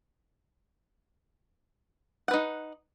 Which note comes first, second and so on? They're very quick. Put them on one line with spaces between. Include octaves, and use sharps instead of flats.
F#5 B4 D#4